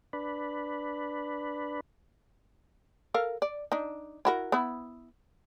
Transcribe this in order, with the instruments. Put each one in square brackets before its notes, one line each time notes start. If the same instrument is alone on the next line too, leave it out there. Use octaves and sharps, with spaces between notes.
[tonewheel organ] D4 B4
[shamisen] A4 A#4 F5
D5
D4 D#4
E4 F#4 A#4
B3 E4